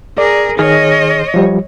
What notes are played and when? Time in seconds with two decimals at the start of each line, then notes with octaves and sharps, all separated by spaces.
0.18 G#4 A#4 D5
0.59 D#3 G#4 C#5 D#5 F6
1.34 F3 G3